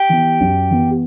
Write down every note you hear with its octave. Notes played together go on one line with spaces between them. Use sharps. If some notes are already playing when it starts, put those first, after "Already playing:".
Already playing: G4
E3 B3
F#2
E3 B3